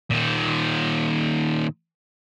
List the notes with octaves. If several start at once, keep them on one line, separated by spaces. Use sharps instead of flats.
A#2 D#3